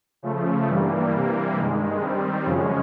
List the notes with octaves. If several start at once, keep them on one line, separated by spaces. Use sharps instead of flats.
C#3 F3 A3
G2 E3 G3 A#3
C3 E3 G3 A#3
G2 D#3 G#3
D#3 G3 C4
F#2 C#3 F3 G#3 C#4